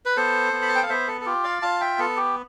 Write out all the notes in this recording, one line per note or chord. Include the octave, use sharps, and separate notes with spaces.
B4
B3 A4 C5
B3
B5
A5
G5
F5
B3 C5 E5
A4
A4
F4 G4
D5 F5
F4 F5 A5
E5 G5
B3 A4
G4